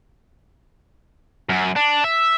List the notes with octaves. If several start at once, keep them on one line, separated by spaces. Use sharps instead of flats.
F#2
D4
E5